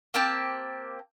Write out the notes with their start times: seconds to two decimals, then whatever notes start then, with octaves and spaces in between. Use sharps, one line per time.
0.14 A#3 C4 G4 A5